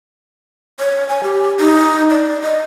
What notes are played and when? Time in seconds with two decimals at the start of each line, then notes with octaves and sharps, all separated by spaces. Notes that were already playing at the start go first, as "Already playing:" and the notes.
0.80 C#5
1.09 G#5
1.24 G4
1.60 D#4
2.10 D5
2.42 D#5